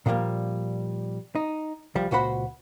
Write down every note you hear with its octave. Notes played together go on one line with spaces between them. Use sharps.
A#2 D3 F3 G3 A#3
D#4
C2 F3 G3
C#2 A#2 F#4 C5 F#5 B5